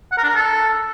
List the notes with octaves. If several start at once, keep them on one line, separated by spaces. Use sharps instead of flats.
F#5
A#4
D4
A#4
A4